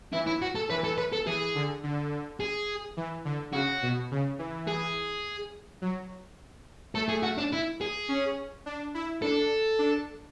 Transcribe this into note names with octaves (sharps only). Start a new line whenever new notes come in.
E3 E4
E4
F#4
A4
E3 B4
A4
B4
A4
E3 G#4
D3
D3
G#4
E3
D3
C#3 F#4
B2
C#3
E3
G#4
F#3
A3 A4
G#4
F#4
D4
E4
G#4
C#4
D4
E4
D4 A4
D4